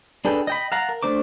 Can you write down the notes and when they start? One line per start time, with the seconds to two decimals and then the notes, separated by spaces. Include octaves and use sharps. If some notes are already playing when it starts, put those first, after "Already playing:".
0.25 D4 G#4 A4 B4 G5
0.47 D#5 G5 B5
0.72 F5 F#5 A5 A#5
0.89 A#4
1.03 A3 D4 C5 D6